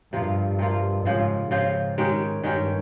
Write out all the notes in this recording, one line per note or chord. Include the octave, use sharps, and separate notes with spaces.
G2 C3 F3 A#3 F4
C3 F3 A#3 F4
G#2 C#3 F3 C4 F4
G#2 C#3 F3 C4 F4
D#3 G#3 C#4 G4
G2 D#3 G#3 C#4 G4